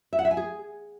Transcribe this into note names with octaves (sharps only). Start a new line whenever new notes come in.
E5
F#5
E5
G#5
G#4